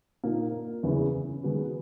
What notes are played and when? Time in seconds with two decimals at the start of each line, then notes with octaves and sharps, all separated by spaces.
0.24 A#2 A#3 D#4 A#4
0.83 E2 C#3 E3
1.43 D#3 G#3 B3 F#4